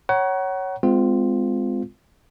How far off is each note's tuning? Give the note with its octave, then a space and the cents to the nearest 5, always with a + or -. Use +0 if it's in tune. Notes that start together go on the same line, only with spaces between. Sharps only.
C#5 +0 F#5 +30 A#5 +35
G#3 +0 C4 -30 F4 +0